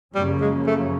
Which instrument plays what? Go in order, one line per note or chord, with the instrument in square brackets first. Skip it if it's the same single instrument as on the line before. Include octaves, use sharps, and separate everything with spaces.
[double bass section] F#2 C#3 F3 A#3 C#4 [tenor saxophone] G3
[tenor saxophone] G#3
A3